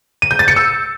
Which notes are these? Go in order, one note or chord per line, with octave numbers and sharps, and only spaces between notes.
D#7
G6
A6
C#7
E6